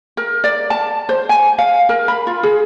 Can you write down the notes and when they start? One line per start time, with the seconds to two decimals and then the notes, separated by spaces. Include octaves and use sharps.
0.17 A#4
0.44 D5
0.70 A5
1.09 C5
1.29 G#5
1.58 F5
1.89 A#4
2.08 B5
2.27 F4
2.43 G#4